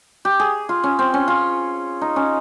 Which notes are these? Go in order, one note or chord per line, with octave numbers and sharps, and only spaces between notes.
G4
G#4
F4
C#4
C4
C#4
F4
D#4
C#4